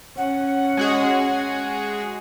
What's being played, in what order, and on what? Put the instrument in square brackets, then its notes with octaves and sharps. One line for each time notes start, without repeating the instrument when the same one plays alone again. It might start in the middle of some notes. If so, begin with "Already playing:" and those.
[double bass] C#4 [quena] F#5
[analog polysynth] G#3 F#4 G#4